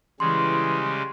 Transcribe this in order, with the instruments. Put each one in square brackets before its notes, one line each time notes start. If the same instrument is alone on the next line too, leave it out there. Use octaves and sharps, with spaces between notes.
[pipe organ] C#3 G3 G#3 [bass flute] E3 [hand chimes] C6